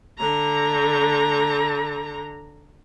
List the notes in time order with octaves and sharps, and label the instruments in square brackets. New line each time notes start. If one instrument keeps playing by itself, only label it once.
[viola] D3 A#5